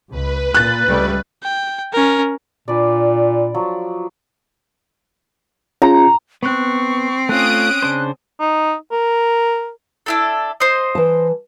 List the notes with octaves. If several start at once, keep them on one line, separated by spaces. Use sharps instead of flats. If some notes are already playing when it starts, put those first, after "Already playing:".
C#2 B4
A#2 F#6 A6
C#2 G3 A3
G5
C#4 A#4
A#2 D4 B4 D5
F3 F#3
C#4 F4 G#4 A#5
B3 C4 C#6 F#6
A3 C#4 F4 D#6 F#6 D7
C#3 D4 C5
D#4
A#4
D4 E4 A4
C5 D#5
E3 A5